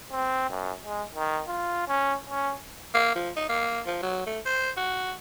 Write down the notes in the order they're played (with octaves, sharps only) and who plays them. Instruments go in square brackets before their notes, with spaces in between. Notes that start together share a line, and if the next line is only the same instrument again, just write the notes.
[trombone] C4
F#2
G#3
D#3
F4
C#4
C#4
[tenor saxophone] A#3
F3
D#4
A#3
F3
F#3
A3
C5
F#4